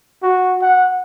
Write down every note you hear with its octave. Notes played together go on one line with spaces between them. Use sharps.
F#4
F#5